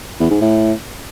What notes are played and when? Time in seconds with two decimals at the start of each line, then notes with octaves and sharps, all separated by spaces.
0.20 E2
0.30 G#2
0.41 A2